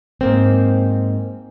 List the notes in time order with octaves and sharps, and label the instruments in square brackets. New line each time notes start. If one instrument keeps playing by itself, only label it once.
[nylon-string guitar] G#2 A#3 C4